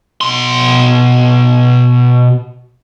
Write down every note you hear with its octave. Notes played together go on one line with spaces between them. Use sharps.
B2 C6